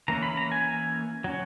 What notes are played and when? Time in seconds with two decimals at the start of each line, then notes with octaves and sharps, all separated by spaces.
0.08 E3 A#3 C#4 A#5
0.23 B5
0.37 A#5
0.52 G#5
1.24 F#3 C#4